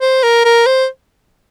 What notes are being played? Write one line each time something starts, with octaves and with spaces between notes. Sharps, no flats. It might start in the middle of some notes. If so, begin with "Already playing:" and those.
C5
A#4
A#4
C5